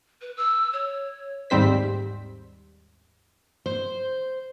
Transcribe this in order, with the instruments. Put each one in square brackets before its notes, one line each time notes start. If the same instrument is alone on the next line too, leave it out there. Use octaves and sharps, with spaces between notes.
[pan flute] B4
E6
C#5
[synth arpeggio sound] D#2 G#2 G3 C4 C5 B6
[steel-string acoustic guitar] C5